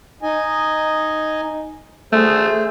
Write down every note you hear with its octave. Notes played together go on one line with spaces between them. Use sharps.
D#4 D#5 G#5
A3 G#4 C5